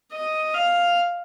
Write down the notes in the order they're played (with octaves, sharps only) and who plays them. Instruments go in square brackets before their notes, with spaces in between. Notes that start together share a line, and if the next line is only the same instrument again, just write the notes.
[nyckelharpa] D#5
F5